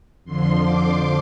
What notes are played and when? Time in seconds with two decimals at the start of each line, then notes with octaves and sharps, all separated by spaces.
0.24 F2 D3 F3 C6
0.61 D6